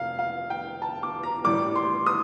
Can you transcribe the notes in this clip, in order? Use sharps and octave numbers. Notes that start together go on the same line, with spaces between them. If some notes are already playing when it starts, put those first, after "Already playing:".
Already playing: F1 F5
F5
G5
A5
D6
A#5
A1 A2 G3 D6
C6
D#6